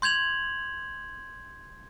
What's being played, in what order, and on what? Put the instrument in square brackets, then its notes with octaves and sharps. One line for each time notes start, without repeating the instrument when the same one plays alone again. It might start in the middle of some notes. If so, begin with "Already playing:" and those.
[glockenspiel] C6 G6 G#6 F7 F#7